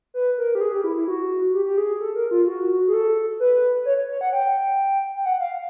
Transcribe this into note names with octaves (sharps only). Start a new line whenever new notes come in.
B4
A#4
G4
G#4
G4
E4
E4
F#4
G4
G4
G#4
A4
A#4
F4
F#4
G#4
A4
B4
C#5
C#5
F#5
G5
G5
F#5
F5